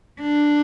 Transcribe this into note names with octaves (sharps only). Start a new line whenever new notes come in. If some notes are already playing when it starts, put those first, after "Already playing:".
D4